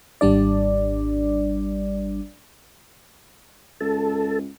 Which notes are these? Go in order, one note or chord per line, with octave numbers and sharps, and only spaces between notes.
G#1 G3 D4 D5
C#2 A4